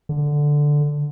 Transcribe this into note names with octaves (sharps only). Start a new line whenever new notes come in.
D3